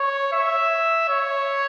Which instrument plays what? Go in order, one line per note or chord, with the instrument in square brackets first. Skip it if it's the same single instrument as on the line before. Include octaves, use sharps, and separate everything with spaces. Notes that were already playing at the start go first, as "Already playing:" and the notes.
Already playing: [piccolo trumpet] C#5
E5
C#5